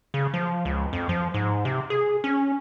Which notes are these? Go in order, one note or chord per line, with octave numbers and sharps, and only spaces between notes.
C#3
F3
C#2
F2
F3
G#2
C3
G#4
C#4